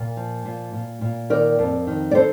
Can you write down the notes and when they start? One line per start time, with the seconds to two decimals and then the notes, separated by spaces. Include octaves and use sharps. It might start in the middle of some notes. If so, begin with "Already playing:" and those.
Already playing: A#2 A#4
0.16 F3
0.45 A#2
0.73 A#2
1.01 A#2
1.30 D#3 A#4 D5
1.59 F2
1.87 D#3
2.11 D5
2.15 D#3 A4 C5